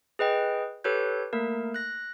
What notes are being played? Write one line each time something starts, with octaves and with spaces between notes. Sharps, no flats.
G#4 B4 D#5 G5
G4 A4 B4 C#5 G6
A3 A#3 A#4
F#6 A#6